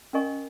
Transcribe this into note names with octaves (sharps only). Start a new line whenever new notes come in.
C#4 A#4 D#5 G#5 C#6